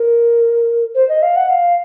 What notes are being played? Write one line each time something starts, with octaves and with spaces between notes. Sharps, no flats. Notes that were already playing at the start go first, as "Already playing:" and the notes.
Already playing: A#4
C5
D#5
F5
F#5
F5